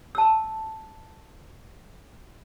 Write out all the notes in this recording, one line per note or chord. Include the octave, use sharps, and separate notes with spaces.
A5 E6